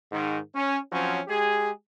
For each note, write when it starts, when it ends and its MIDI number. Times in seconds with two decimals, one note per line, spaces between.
0.12 0.38 44
0.12 0.38 51
0.55 0.77 61
0.92 1.20 53
0.92 1.20 54
0.92 1.20 60
0.92 1.20 61
1.28 1.70 56
1.28 1.70 67
1.28 1.70 68